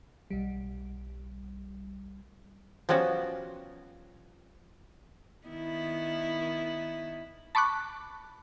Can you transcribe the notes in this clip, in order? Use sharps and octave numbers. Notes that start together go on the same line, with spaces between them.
B1 G3
F3 G3 B3 C#4 F#4
D#3 B3 E4
A5 B5 C#6 D6 F#6